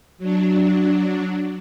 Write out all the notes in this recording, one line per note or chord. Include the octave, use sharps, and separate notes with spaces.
F#3 D4